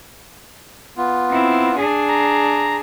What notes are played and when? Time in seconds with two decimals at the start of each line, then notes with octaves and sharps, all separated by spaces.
0.97 B3 F4
1.30 C4 E4
1.76 D4 G#4
2.08 A#5